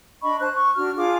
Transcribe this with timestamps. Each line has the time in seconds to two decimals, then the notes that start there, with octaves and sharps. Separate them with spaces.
0.22 D4 D#5 B5 C#6
0.40 C5 A5 F#6
0.53 C#6
0.75 D4 F#4 F6
0.96 D4 F4 G#4 D6